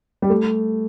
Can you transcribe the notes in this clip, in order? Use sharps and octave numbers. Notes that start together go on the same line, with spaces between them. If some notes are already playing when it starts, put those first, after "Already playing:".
G3
A3